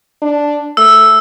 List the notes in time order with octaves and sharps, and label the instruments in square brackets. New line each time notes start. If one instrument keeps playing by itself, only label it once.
[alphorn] D4
[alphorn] A3 [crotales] E6